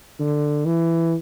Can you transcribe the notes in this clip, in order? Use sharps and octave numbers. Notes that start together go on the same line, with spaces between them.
D3
E3